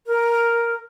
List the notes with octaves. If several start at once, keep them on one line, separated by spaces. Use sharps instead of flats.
A#4